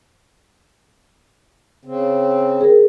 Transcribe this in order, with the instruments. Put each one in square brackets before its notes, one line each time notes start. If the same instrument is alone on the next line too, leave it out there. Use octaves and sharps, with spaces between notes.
[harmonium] C#3 C4
[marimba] G#4 A#4